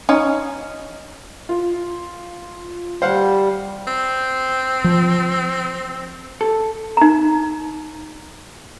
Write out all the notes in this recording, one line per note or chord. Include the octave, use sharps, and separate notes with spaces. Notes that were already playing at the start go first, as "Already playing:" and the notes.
C#4 D#4
F4
G3 C5 F5 F#5
C4
F3
A4
D#4 A#5